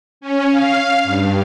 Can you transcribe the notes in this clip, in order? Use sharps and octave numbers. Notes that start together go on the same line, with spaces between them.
C#4
F5
G2